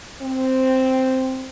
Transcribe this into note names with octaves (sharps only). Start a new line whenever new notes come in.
C4